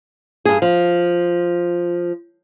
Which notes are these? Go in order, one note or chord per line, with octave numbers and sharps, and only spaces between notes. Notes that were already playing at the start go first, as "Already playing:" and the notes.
G2 G#4
F3